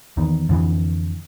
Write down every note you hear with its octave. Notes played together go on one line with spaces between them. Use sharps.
E2 D#3
F2 D3 E3